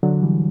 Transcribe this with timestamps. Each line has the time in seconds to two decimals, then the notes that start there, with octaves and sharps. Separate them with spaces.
0.03 D3 F#3
0.22 E3 G3